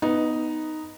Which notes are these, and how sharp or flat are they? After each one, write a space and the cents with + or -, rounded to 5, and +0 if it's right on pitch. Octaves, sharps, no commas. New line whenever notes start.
B3 +5 D#4 +0 D#5 +0